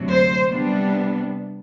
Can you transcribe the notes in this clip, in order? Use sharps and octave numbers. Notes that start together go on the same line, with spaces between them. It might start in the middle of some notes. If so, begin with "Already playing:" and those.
Already playing: D2 C3 F#3
C5
C3 G3 B3 D4